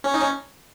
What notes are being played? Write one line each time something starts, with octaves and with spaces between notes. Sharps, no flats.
C#4
D#4
C#4